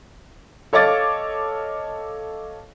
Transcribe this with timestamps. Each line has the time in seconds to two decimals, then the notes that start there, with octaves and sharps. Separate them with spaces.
0.73 A4 C#5 D#5 F5 D6 A6